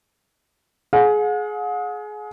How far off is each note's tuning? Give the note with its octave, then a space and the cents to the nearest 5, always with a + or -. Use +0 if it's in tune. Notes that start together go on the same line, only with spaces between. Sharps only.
G#4 +25 F#5 -45